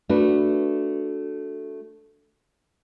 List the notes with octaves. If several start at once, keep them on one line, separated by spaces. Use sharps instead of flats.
A3 D4 F#4 B4